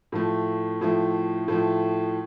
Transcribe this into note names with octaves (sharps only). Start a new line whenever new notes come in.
A2 F3 A3
A2 F3 A3
A2 F3 A3